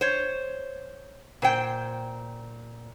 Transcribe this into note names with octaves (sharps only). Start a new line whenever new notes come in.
C5 C#5
A#2 C5 G5